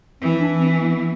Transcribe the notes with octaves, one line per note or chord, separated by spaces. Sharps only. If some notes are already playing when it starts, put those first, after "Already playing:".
E3 C4
D4
C4
B3